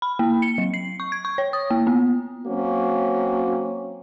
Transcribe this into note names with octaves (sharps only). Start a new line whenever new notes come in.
B5
A#3
C#7
F#3
C7
C#6
G#6
C#6
C#5
D#6
A#3
B3
F#3 A#3 C4 C#4 F#4